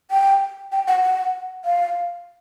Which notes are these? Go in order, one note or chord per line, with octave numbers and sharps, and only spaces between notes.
G5
G5
F#5
F#5
F5